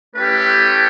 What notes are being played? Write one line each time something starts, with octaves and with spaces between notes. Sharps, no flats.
A3 C#4 E4 G4 B4